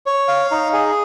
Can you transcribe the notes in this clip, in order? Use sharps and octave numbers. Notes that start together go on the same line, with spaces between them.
C#5
F5
D#4
G#4